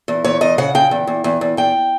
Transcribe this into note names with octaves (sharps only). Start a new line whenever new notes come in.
E2
E2 C#5
E2 D#5
C#3 F#5
C#3 G5
E2
E2
E2
E2
E2 G5